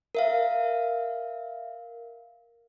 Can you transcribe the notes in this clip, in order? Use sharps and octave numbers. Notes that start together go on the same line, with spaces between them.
A#4 E5 F5